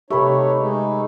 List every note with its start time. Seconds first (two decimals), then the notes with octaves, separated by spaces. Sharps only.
0.11 C3 A3 D#4 G4 B4 C#5
0.59 G#3 D#4